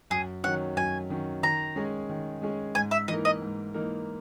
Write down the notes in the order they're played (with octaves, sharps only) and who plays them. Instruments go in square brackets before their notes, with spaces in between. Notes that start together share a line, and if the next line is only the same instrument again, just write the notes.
[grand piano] F#2 [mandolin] G#4
[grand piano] D#3 F#3 C#4 [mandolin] F#5
[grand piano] F#2 [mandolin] G#5
[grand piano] D#3 F#3 C#4
[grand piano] D#3 [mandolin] A#5
[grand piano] G#3 C#4 G#4
D#3
G#3 C#4 G#4
[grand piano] G#2 [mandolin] G#5
[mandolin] E5
[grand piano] E3 A#3 D#4 A#4 [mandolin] D#5
[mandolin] D#5
[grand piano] G#2
E3 A#3 D#4 A#4